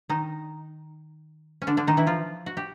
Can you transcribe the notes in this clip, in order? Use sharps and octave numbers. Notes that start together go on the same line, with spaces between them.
D#3 D#4
C#4
D3 D4
D3 D4
D#3 D#4
E3 E4
F3 F4
F#4
G4